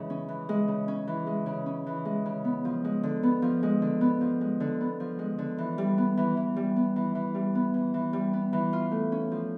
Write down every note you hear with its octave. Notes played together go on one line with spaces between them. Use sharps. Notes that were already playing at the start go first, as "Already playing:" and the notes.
Already playing: C#3 E3 G#3
C#4
E3
G#3
C#3
C#4
E3
G#3
C#3
C#4
E3
G#3
C#3
B3
F3
G#3
D3
B3
F3
G#3
D3
B3
F3
G#3
D3
B3
F3
G#3
D3
E3
G3
B3
E3
E3
G3
B3
E3
E3
G3
B3
E3
E3
G3
B3
E3
F4
A3
C#4
F3